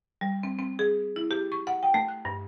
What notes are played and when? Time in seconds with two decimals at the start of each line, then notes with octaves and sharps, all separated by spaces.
0.21 G3
0.43 C4
0.59 C4
0.79 G#4
1.16 E4
1.31 G4
1.52 C#6
1.67 F#5
1.83 G5
1.94 A3
2.08 F#6
2.25 G2